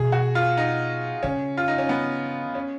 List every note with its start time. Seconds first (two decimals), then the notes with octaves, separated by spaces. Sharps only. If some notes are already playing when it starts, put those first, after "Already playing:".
Already playing: B2 G#4
0.12 F#4
0.35 F4
0.57 D#4
1.23 C#3 C#4
1.57 F4
1.68 D#4
1.78 C#4
1.89 B3
2.55 C#4